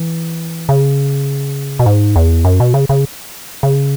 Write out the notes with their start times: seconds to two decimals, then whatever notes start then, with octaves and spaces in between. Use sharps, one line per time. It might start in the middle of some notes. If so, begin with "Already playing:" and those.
Already playing: E3
0.69 C#3
1.79 B2
1.86 G#2
2.16 E2
2.45 F#2
2.60 B2
2.74 C#3
2.89 C#3
3.63 C#3